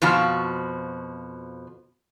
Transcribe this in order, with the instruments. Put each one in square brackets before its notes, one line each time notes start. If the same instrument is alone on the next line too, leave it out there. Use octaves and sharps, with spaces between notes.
[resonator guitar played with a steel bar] F2 B2 F3 F#4